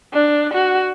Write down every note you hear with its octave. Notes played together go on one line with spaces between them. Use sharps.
D4
F#4